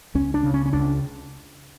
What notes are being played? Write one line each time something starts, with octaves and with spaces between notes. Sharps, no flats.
C#2 C#4
D4
C#3
C#4
C#4
C#2 D4